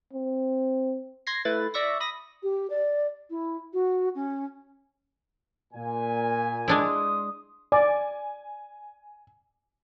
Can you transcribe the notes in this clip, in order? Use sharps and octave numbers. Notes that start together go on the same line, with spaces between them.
C4
C6 G#6 A#6 C7
A3 E4 B4 A6
D5 E5 C#6 A#6
B5 D#6 A#6
G4
D5
E4
F#4
C#4
A#2 G#5
G#3 D4 E4 C6 D#6
D5 G#5